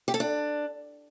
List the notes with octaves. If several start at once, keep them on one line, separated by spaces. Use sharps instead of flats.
G4
A4
D4